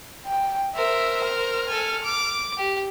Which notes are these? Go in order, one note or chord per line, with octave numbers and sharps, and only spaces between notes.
G5
A#4 C5 E5
F6
A4 G#5
D6
G4